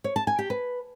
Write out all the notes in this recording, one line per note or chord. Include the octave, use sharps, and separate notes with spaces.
C#5
A5
G#5
G4
B4